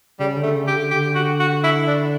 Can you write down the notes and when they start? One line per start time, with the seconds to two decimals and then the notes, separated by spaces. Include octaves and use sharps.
0.19 C#3 G3
0.37 D3
0.43 A3
0.55 C#3
0.67 G4
0.73 D3
0.91 G4
1.15 F#4
1.40 F#4
1.64 E4
1.87 D4